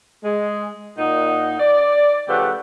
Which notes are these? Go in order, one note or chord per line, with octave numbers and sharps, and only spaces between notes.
G#3
A#2 D#4 F#5
D5
C#3 F3 A3 G4 B4 F#5